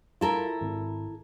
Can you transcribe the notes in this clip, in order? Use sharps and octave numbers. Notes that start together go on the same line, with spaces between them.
E4 F4 A4 A#4
G#1